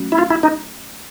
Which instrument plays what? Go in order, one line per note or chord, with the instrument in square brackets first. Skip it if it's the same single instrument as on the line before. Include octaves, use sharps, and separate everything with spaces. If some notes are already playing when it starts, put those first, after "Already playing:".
Already playing: [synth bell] F#3 A3 C#4 F#4
[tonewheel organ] E4
F4
E4
D#4